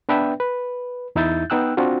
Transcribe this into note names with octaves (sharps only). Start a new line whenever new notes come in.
B3 D4 B4 D5 E5 G5
B4
E2 D#4 E4 E5 G6 A6
B3 D#4 G5 E6 F#6
C4 D4 F4 F#4